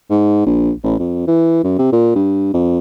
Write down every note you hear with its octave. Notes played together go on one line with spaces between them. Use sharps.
G#2
A#1
A1
F2
E3
F#2
C3
A#2
G2
F2